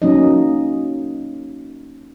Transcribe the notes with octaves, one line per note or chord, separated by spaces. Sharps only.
F#3 A#3 C#4 D#4 D#5